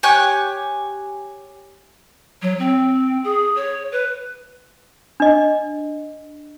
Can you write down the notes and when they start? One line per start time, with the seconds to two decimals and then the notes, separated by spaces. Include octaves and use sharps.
0.03 G4 C#5 G#5 F#6
2.42 F#3
2.59 C4
3.24 G#4
3.56 C#5
3.92 B4
5.20 D4 D#5